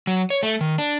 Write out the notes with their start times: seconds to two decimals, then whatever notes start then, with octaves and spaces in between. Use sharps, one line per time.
0.07 F#3
0.30 C#5
0.43 A3
0.61 D#3
0.78 D4